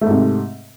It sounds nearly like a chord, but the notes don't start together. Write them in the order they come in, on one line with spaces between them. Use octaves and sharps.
A3 G#2 C3